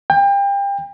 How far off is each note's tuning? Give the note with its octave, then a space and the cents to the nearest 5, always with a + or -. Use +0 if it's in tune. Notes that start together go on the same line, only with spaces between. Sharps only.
G5 +30